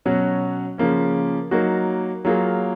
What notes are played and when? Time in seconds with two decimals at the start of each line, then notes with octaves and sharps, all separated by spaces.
0.05 B2 F#3 C#4 F#4
0.78 C#3 F3 A#3 C#4
1.51 F#3 A#3 D#4 F#4
2.25 F#3 A#3 F4 G#4